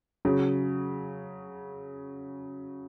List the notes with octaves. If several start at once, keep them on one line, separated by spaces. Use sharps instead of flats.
C#3 F#3